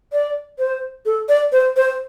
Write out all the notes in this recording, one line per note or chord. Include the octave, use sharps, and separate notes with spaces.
D5
C5
A4
D5
C5
C5